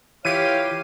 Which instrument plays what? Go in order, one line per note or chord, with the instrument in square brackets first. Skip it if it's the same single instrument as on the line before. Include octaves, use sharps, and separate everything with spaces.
[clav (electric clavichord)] E3 E4 [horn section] F4 G4 F5 [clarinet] C#5 [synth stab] D#7